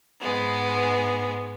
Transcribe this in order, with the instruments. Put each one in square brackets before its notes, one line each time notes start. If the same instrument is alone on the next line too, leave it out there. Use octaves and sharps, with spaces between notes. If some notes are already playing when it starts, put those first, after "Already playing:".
[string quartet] G#2 G#3 B3